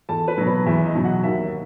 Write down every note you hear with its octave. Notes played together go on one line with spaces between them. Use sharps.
E2 A4 A5
B4 B5
B2 F#3
B4 B5
E2 E5
D#5
B2 F#3
F#4 F#5
D#2 E5